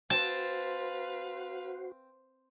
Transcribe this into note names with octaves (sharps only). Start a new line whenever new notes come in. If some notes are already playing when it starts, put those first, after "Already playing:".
C4 F#4 B4 C5 F5 A5